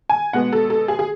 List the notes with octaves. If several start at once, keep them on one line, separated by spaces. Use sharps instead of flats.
G#5
B2 G#3 B3 F#5
A4
A4
G#4
G#4